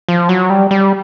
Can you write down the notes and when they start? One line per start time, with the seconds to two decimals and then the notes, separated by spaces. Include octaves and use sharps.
0.08 F3
0.29 F#3
0.50 G3
0.71 G3